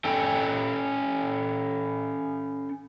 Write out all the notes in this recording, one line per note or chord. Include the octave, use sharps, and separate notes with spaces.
C#4 A4 G5